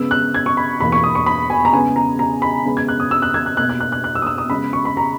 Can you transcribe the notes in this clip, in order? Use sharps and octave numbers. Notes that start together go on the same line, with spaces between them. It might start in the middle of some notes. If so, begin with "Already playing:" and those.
Already playing: C#3 G#3 B3 E6
F#6
G#6
C#6
B5
E2 B2 A#3 B5
C#6
D#6
C#6
B5
G#5
A#5
C#3 G#3 B3 G#5
A#5
A#5
B5
C#3 G#3 B3
G#6
F#6
D#6
E6
F#6
G#6
F#6
B2 A#3 F#6
F#6
F#6
F#6
F#6
E6
D#6
E6
D#6
C#3 G#3 B3 B5
C#6
B5
A#5